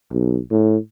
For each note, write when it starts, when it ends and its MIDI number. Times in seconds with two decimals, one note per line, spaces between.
0.12 0.39 35
0.51 0.77 45